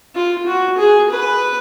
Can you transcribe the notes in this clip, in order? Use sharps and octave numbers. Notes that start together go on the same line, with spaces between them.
F4
F#4
G#4
B4